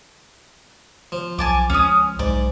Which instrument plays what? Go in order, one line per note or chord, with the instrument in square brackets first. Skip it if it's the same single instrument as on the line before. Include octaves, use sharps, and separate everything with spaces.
[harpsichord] F3
[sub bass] B1 [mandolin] G#5 A5 D6
[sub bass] C#2 [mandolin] C#4 D#6
[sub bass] B1 [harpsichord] G#2 [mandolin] D5